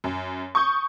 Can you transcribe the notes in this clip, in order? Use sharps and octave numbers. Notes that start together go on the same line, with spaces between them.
F#2
C#6 D#6 G6